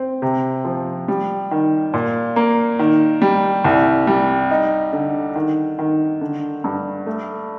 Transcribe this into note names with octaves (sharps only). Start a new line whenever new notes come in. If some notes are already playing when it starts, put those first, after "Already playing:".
Already playing: C4
C3
F3
G3
D#3
A#2
A#3
D#3
G3
C2
G3
D#4
D3
D#3
D#3
D3
G2
A3